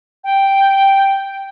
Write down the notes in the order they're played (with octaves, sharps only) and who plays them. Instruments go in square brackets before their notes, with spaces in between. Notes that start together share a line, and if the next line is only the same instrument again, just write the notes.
[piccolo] G5